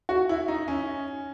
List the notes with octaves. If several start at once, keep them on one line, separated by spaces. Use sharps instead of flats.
F#4
E4
D#4
C#4